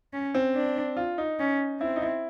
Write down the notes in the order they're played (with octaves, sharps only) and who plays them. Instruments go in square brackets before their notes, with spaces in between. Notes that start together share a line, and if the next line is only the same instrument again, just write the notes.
[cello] C#4
[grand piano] C4
[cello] D4
[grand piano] F4
D#4
[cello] C#4
[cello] C4 [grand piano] E4
[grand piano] D#4
E4